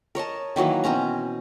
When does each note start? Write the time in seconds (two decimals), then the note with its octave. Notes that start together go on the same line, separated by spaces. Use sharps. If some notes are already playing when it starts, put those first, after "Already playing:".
0.15 A#4 C#5 D#5 A5
0.56 D#3 E3 F#3 A#3
0.84 B2 C4 C#4 A#5